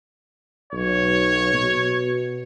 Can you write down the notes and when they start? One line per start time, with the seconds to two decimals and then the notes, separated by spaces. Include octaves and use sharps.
0.73 B1 C#5
1.53 B2